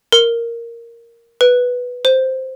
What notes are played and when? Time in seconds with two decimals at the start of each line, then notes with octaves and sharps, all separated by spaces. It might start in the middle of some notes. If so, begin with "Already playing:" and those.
0.12 A#4
1.41 B4
2.05 C5